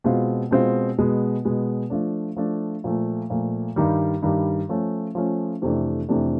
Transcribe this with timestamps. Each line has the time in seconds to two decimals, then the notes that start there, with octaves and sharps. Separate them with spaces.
0.04 B2 G#3 C4 F4
0.51 B2 G#3 C4 F4
0.98 B2 G#3 B3
1.45 B2 G#3 B3
1.90 F3 A3 D4
2.36 F3 A3 D4
2.84 A#2 F3 A3
3.30 A#2 F3 A3
3.76 G2 D#3 G3
4.22 G2 D#3 G3
4.69 F3 A3 C#4
5.15 F3 A3 C#4
5.62 F2 C3 E3 A3 D4
6.09 F2 C3 E3 A3 D4